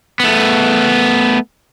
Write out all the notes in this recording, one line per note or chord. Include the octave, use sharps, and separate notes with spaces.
A3 B3